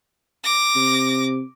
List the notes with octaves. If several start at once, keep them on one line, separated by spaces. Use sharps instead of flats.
D6 A#6
C3